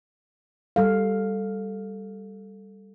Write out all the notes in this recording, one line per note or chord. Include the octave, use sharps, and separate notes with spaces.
G3 A4 F5